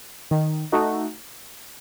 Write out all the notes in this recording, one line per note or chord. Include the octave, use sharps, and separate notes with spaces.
D#3
A3 D#4 F#4